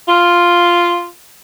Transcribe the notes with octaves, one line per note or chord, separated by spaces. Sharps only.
F4